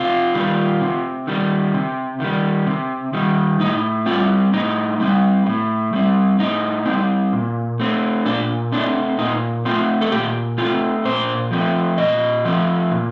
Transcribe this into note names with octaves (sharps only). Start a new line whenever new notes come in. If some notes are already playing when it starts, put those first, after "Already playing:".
Already playing: C3 F4
D#3 G3
C3
D#3 G3
C3
D#3 G3
C3
D#3 G3
A2 D#4
G3 C4 F4
A2 D#4
G3 C4
A2
G3 C4
A2 D#4
G3 C4
A#2
A3 C4
A#2 D4
A3 C4 D4
A#2 D#4
A3 C4 F4
A4
A#2 G4
A3 C4 F4
A#2 C5
F3 A3 C4
A#2 D#5
F3 A3 C4
A#2